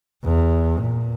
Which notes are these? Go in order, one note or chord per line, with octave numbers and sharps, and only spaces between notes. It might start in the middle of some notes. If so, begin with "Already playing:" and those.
E2
A#2